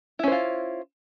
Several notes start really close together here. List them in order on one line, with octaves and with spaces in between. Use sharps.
E4 C#4 C5 F4